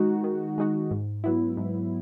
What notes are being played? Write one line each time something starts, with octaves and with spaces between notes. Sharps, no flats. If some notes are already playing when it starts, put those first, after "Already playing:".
Already playing: D#3 G#3 D#4 F#4
D#3
G#3 D#4 F#4
G#2
F#3 B3 E4
G#2